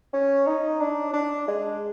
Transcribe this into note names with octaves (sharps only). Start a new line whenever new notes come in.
C#4
D#4
D4
D4
G#3